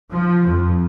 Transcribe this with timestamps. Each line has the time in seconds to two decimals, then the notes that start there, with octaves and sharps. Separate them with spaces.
0.12 F3
0.48 F2